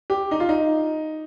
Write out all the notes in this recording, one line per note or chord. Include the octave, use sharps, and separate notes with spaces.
G4
D#4
F4
D#4